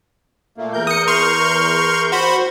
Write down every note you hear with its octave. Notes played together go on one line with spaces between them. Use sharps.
A#2 A3 A#3
E2 A#4 G6
D#6 C#7
C6 C#6 F6
F#4 C5 B5